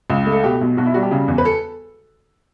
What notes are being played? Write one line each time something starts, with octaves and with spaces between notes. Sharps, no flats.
C#2
A3
A4
B2 G4
B1
B1 F#4
E4
G3 F#4
G4
C#3
E2
B4
A4